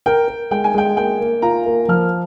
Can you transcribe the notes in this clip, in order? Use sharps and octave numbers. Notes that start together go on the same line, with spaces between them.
A#4 G5
A#4
G#3 G5
G#5
G#3 G5
A#3 G5
A#3
F4 A#5
A#3
F3 F6